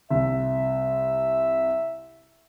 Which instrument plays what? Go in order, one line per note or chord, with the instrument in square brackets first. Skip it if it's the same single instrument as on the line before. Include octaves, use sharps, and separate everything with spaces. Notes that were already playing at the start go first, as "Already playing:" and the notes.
[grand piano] C2 [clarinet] E5